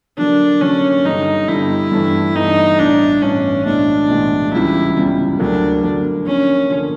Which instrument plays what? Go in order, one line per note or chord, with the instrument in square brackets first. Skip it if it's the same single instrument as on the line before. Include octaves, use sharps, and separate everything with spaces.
[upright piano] D3 F#3 A#3 [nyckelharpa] D4
[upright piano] D3 F#3 A#3 [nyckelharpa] C#4
[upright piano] G2 D3 G3 [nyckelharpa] D#4
[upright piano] G2 D3 G3 [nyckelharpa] E4
[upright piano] G2 E3 A3 D4
[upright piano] G2 E3 A3 D4 [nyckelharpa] D#4
[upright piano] A1 G2 E3 [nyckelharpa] D4
[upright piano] A1 G2 E3 [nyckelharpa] C#4
[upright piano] B1 A2 E3 G#3 [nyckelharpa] D4
[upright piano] B1 A2 E3 G#3
[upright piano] C#2 C#3 E3 G3 [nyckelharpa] E4
[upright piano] C#2 C#3 E3 G3
[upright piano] D2 D3 F#3 A#3 [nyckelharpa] D4
[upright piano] D2 D3 F#3 A#3
[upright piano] D3 F3 A#3 [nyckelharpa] C#4
[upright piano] D3 F3 A#3